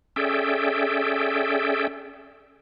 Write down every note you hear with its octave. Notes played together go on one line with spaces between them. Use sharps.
C#4 G#4 A4 D5 E5 G5